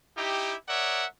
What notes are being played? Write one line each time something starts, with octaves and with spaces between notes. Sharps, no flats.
D#4 E4 G4
A#4 C#5 D5 E5 F#5